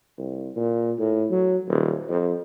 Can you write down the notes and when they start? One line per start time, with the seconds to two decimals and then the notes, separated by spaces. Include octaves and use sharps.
0.18 C2
0.56 A#2
0.99 A2
1.31 F#3
1.68 D#1
2.09 F2